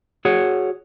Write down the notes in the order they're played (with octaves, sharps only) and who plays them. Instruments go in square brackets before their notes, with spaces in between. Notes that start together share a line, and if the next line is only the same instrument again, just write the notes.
[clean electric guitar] F#4 G#4 C#5 F#5